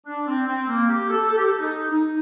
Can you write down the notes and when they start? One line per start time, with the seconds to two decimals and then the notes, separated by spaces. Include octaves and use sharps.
0.06 D4
0.27 C4
0.47 C4
0.68 A#3
0.89 G4
1.09 A4
1.30 A4
1.37 G4
1.45 A4
1.59 D#4
1.90 D#4